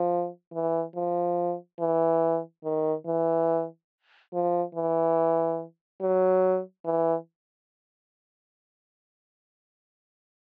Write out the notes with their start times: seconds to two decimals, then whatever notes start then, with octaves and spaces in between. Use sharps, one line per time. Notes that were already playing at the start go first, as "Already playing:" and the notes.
Already playing: F3
0.54 E3
0.96 F3
1.80 E3
2.64 D#3
3.06 E3
4.33 F3
4.75 E3
6.01 F#3
6.85 E3